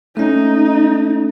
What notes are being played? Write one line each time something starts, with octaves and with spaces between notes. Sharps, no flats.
A3 C#4 D#4